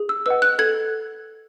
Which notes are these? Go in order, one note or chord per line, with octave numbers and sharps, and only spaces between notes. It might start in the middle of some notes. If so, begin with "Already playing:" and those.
Already playing: G#4
E6
B4 D#5 F#5 E6
F#6
A4 G#6